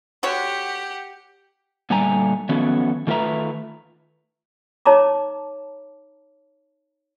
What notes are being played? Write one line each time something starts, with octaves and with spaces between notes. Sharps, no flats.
D3 F#4 G4 C#5 F#5
A#2 D3 G3 A3 G#5 A#5
D#3 F3 F#3 A3 B3 C#4
D#3 A3 F4 B4 E5 A#5
D#4 C#5 A5 A#5 D6